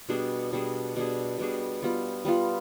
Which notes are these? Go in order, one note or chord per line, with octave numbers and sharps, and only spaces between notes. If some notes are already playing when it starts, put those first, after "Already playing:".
B2 G3 D4 G#4
B2 G3 D4 G#4
B2 G3 D4 G#4
B2 G3 D4 G#4
G3 B3 F4
G3 B3 F4